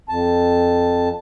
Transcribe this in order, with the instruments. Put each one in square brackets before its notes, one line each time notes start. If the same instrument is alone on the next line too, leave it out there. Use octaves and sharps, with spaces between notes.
[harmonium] F2 A5